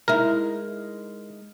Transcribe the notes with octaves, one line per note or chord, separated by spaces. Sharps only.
G#3 D#4 E4 A#4